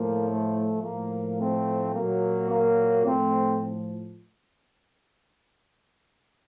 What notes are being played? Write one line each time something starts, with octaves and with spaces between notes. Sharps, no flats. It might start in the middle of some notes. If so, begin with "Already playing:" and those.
Already playing: A2 F3 A#3
A3
A2 F3 A#3
A3 C4
A#2 F#3 A#3
A#3
A2 F3 A3 C4